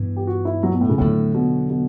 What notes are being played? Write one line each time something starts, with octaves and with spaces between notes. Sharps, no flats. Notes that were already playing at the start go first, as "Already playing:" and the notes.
Already playing: G2 E3 B3
G4
F#4
E4
F#3
B2
A2
C#3
E2 A2 D3 F#3
B2
B2